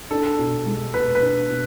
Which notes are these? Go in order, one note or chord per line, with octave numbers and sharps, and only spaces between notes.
D4 A4
B2
G#3
B2 B4
B4
D4
B2